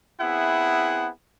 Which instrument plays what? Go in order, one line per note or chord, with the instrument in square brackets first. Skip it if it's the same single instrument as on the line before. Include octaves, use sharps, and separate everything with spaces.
[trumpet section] B3 C4 E4 G#4 E5 F#5